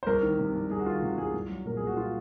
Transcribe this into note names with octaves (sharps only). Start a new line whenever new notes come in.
C5
C2 A#4
D#3
C3
C2
C2 G#4
F#4
D#3 F4
C3 F#4
C2 G#4
C2
F#3
A#2 A#4
C2 G#4
F#4
F4